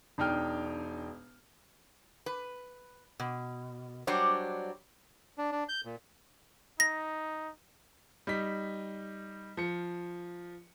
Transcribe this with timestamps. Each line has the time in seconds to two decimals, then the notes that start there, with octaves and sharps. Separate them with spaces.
0.18 E1 D4 D#4 G5 F6
2.26 B4
3.20 B2
4.07 F#3 G3 D4 C5 C#5
5.38 D4
5.52 D4
5.69 G6
5.85 A#2
6.80 D#4 A#6
8.27 G3 D#4 B6
9.57 F3 C#7